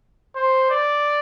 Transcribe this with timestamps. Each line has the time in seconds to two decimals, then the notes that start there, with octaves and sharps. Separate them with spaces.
0.36 C5
0.70 D5